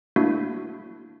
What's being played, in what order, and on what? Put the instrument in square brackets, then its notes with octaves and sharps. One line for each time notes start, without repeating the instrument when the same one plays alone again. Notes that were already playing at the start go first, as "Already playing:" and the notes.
[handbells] A3 A#3 D4 E4 F#4